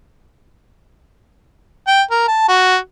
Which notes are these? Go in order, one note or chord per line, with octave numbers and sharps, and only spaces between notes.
G5
A#4
A5
F#4